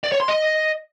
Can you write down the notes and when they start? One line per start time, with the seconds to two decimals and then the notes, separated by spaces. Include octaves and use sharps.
0.04 D5
0.12 C#5
0.20 C6
0.28 D#5